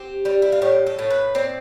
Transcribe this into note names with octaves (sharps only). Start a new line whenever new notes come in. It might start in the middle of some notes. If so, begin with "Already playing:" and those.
Already playing: C4 G4
G3
E4
F4
A2 G4
A4
A2
B4
C4 D5